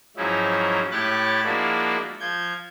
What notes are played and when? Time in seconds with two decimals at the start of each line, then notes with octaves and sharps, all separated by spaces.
0.17 G#2 F3 F#3 C#4 D#4 E4
0.92 A2 E4 G4 C#5 F#6 A6
1.44 F3 G#3 A#3 D4 E4 F#4
2.20 F3 G6 G#6